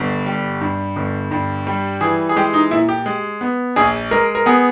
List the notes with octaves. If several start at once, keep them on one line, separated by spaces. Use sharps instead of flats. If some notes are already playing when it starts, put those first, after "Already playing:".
Already playing: G1 G2
G3
G2
G1
G2
G3
E3 G#4
G#4
G#3 G4
D#4
A#2 E4
G4
G#3
B3
A#1 G#4
G#3 A#4
A#4
B3 G#4